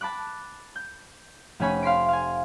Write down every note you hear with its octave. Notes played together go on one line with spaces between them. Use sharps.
A5 B5 D6 F#6
G6
F1 A3 C#4 G#5 B5
F5 C6 B6 D7
F5 G#5